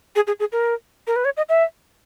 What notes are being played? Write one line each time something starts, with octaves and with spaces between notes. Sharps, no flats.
G#4
G#4
G#4
A#4
A#4
B4
C#5
D#5
E5